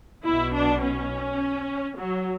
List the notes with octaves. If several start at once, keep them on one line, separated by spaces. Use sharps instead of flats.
B1 B2 E4
D4
C#4
F#3